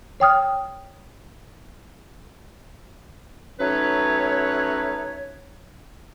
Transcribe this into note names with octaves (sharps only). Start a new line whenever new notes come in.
C#5 G5 D#6 F6
F#3 A3 C#4 D#4 B4 C#5